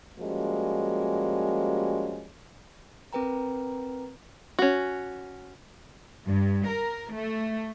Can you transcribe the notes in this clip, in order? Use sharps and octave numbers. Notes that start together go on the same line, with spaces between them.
F3 G3 G#3 A#3 C#4 F#4
C4 A#4 B4 G5 A#5
C#4 F#4
G2
A#4
A3